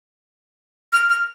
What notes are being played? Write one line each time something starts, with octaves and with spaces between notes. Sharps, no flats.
F6
F6